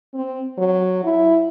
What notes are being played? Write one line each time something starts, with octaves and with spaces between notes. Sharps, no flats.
C4
F#3
E4